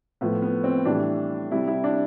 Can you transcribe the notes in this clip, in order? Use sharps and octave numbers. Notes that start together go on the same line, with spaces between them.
A2 F3 B3
B3
C4
A2 E3 G3 D4
C3 G3 E4
E4
D4